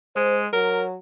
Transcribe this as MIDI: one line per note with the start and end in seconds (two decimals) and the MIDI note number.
0.16 0.47 56
0.16 0.40 72
0.53 0.94 54
0.53 0.83 70